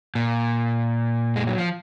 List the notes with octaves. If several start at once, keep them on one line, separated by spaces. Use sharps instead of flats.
A#2
G#3
F#3
F3